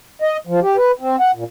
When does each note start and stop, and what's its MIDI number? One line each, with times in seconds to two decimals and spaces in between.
0.22 0.37 75
0.47 0.60 53
0.62 0.77 67
0.77 0.91 71
1.00 1.16 60
1.20 1.31 78
1.35 1.44 46